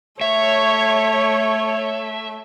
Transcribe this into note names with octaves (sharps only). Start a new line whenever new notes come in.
A3 C#5 E5